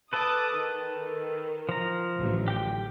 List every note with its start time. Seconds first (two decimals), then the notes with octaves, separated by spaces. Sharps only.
0.13 A4 B4 A5 D6 D#6
0.53 D#3
1.69 F3 A#5
2.17 A1 D3 F#3
2.48 G4 G5